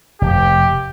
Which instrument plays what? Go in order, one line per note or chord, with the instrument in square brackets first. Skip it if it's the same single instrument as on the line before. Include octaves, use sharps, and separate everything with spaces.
[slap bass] F1 [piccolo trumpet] G4